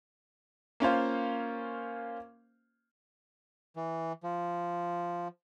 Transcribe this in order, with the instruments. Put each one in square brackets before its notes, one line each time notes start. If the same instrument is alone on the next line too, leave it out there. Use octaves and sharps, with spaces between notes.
[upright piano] A#3 C#4 F4 C5
[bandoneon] E3
F3